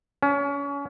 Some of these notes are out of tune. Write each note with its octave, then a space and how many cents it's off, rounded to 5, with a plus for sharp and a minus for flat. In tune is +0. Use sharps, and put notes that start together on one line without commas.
C#4 +30